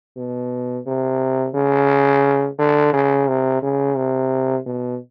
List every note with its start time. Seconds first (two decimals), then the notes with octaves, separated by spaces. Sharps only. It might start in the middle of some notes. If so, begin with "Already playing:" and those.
0.17 B2
0.86 C3
1.54 C#3
2.59 D3
2.93 C#3
3.28 C3
3.62 C#3
3.96 C3
4.66 B2